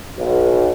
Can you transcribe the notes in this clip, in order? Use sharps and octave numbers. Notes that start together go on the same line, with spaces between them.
B1